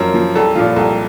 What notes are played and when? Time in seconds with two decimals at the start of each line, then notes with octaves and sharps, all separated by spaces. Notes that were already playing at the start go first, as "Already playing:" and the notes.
Already playing: F#2 F3 A#4
0.14 F3
0.35 C2 A4
0.55 A#2 F3 F4
0.76 C2 A4